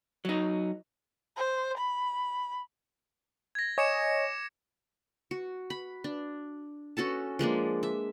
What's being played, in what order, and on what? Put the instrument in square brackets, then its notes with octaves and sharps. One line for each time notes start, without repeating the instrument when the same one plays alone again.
[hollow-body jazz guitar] F#3 D#4
[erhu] C5
B5
[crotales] G#6 A#6
[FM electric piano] C#5 D#5 G#5 [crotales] D6 C#7 E7
[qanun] F#4
B5
D4
C#4 F#4 A4 A5
F3 G#3 A#3 D4
E5